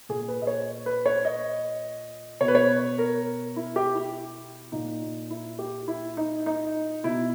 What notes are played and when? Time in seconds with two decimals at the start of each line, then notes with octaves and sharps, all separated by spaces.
0.09 A#2 G#4
0.28 B4
0.42 D#5
0.47 C#5
0.86 B4
1.06 C#5
1.25 D#5
2.41 B2 C#5
2.48 B4
2.55 C#5
2.98 A#4
3.56 E4
3.76 G4
3.95 E4
4.72 A#2 D#4
5.30 E4
5.59 G4
5.88 E4
6.17 D#4
6.46 D#4
7.04 B2 E4